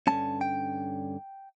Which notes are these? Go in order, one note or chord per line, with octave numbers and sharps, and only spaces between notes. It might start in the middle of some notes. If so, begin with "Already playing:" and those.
G2 D3 A3 C#4 A5
G5